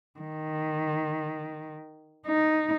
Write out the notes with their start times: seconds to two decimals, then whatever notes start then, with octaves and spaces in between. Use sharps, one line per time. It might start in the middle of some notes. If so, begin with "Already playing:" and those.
0.20 D#3
2.26 D#4